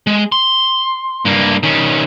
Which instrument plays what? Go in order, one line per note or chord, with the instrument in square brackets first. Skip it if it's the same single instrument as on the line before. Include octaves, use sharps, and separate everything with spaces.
[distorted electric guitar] G#3
C6
G2 A#3
D#3 C#4